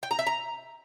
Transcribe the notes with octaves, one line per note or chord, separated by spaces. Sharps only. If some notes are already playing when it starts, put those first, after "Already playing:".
G5
A#5
E5
A#5